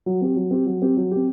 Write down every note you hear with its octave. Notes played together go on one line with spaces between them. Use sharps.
F#3
C4 G4
F#3
C4 G4
F#3
C4 G4
F#3
C4 G4